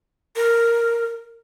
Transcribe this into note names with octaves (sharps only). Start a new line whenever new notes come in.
A#4